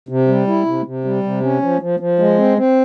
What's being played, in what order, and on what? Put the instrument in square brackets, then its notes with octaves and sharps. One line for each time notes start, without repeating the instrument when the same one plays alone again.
[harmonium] C3
G3
E4
C3
C3
G3
C3
C#4
F3
F3
F3
G#3
C4
C4